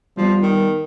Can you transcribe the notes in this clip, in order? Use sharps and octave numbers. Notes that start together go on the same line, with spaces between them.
F3 G3 B3
D#3